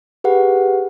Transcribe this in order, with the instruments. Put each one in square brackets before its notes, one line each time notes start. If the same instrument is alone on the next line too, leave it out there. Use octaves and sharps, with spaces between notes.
[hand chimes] G4 G#4 B4 F#5